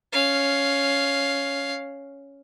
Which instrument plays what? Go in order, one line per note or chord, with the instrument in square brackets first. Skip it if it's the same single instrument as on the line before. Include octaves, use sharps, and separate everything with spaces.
[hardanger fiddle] C#4 F5